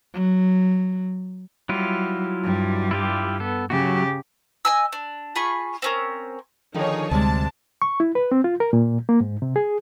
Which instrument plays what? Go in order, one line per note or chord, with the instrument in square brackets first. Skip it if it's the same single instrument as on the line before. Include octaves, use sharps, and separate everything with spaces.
[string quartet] F#3
[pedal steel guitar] F#3 E4 F4 [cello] G3
[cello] G2 G3
[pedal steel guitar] E4 F4 G4
B3 A4
[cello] C#3 G4 [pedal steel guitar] F#3 F#4
[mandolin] D#5 G#5 E6
D4
F4 G#4 B5 C#6
C4 C#4 A#4
[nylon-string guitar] D3 D#3 F3 [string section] D#4 G#4 C#5
[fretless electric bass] D2 [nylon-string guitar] C3 G3 G#3 [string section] D4 A5
[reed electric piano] C#6
E4
B4
C4
F4
A#4
A#2
A#3
G#2
C3
G#4